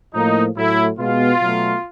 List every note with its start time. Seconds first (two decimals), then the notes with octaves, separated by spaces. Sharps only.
0.12 A2 F3 A#3 D#4
0.55 A2 F#3 A3 E4
0.97 B2 G#3 B3 F4
1.40 B2 F#3 A3